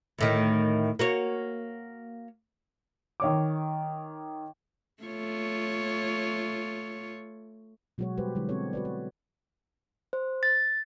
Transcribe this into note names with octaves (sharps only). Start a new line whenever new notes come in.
D2 A2 D#3
A#3 F#4 C#5
D#3 C#5 D6
A3 F4 C#5
B2 F#3 G#3 F#4 G#4 C#5
G3 G#3 G4 B4 C5
D3 F#3 G#3 E4
B3 C4 F#4 A4 C#5
F#4 B4 D5
C#5
C5
A6